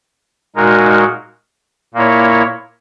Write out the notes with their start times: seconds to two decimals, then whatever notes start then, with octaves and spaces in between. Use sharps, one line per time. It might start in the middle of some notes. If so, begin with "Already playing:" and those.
0.56 A#2 G#3 D#4 F#4 A#4
1.94 A#2 A#3 E4 A#4 C#5